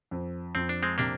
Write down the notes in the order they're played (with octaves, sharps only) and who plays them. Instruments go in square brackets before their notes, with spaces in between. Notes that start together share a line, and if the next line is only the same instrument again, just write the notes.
[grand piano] F2
[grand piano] F2 [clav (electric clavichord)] C4
[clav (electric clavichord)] D4
G#3 C4
[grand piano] C3 [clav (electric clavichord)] A#3 D4